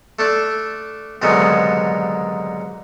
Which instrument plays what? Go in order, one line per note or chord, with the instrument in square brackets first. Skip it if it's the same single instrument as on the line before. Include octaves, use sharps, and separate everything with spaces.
[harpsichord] A3 D4 A4
C2 G#2 D3 D#3 F#3 B3